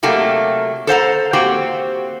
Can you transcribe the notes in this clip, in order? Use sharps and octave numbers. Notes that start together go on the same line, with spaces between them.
C3 F#3 A3 A#3 G4
A4 C5 F#5 A#5
A#3 C4 F#4 G4